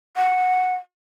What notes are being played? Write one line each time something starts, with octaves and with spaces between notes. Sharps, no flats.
F#5